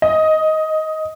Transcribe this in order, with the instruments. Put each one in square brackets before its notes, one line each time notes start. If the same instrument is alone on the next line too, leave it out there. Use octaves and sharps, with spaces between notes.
[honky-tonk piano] D#5